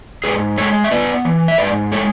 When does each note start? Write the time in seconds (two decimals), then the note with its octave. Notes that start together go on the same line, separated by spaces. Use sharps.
0.24 G#2 G#4 B4
0.58 G#3 A4 C#5
0.84 E5
0.91 B3 B4 D5
1.25 E3
1.48 E5
1.58 G#2 B4 D5
1.92 G#3 A4 C#5